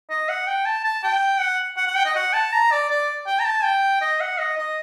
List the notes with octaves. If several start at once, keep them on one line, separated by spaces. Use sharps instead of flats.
D#5
F#5
G5
A5
A5
G5
F#5
F#5
F#5
G5
D#5
F#5
A5
A#5
D5
D5
G5
A#5
A5
G5
D#5
F#5
D#5
D#5